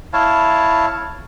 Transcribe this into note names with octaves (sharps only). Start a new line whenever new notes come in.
E4 C#5 F5 A5